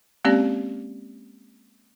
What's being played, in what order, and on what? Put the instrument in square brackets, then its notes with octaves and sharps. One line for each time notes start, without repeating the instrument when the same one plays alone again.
[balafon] G#3 A#3 C4 C#4 G4 D5